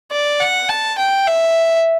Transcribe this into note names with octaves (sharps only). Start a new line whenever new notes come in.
D5
F#5
A5
G5
E5